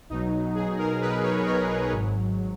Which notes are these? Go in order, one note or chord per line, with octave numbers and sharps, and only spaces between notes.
B1 B2 F#3 D#4
B1 B2 F#3 G#4
A#4
B1 B2 F#3 B4
C#5
B1 B2 F#3 A#4
G#1 G#2 F#3
F#3